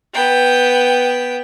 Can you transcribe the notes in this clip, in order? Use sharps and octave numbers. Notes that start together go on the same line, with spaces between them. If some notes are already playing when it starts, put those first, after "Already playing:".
B3 G5